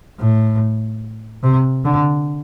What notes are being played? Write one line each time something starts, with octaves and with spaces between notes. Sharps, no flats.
A2
C3
D3